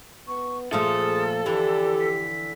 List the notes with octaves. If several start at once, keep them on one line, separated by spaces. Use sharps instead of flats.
B3 C#6
A#2 F3 A3 G#4 A4 D#6
D3 E3 G4 D5
B6